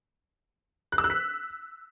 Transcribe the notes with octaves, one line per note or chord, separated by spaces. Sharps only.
F#6
E6
F#6
B6